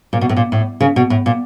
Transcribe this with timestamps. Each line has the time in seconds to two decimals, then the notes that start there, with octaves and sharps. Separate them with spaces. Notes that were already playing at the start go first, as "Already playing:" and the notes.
0.13 A#2
0.21 B2
0.29 A2
0.36 A#2
0.52 A2
0.80 C#3
0.96 B2
1.10 A2
1.26 A#2